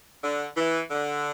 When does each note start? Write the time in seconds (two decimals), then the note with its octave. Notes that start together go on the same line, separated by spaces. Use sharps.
0.23 D3
0.57 E3
0.91 D3